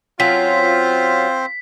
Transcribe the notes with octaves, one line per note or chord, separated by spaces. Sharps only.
F#3 C4 C#4 F4 C5 B6